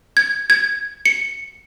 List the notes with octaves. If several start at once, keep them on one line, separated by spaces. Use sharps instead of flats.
G#6
G#6
C#7